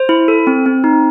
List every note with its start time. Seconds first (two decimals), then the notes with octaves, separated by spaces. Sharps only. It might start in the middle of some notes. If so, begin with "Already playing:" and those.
Already playing: C5
0.09 E4
0.28 A4
0.47 C4
0.66 C4
0.84 D#4